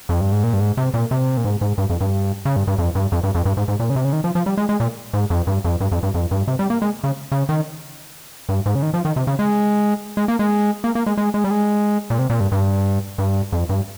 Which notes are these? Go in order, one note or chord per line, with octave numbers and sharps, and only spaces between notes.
F2
G2
G#2
A#2
G2
G#2
C3
A#2
C3
A#2
G#2
G#2
G2
F2
G2
C#3
G2
G2
F2
G2
F2
G2
F2
G2
G#2
G#2
A#2
C#3
C3
C#3
D#3
F3
F3
G3
G#3
G#3
A#2
G#2
F2
G2
F2
G2
F2
G2
F2
G2
C3
G3
A#3
G#3
C#3
C#3
D#3
G2
G#2
C#3
D#3
F3
D#3
C3
C#3
G#3
G#3
A#3
G#3
A#3
A#3
G#3
G#3
G#3
G3
G#3
A#2
C3
A#2
G2
G2
G2
F2
G2